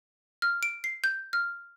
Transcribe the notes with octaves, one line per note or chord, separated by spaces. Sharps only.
F6
D7
C7
G6
F6